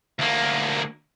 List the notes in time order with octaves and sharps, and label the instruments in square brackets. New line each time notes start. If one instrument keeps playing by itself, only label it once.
[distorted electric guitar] D2 A#3